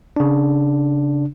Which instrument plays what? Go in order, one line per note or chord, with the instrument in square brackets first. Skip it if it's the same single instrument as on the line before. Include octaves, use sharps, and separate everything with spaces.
[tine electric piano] C#3 D4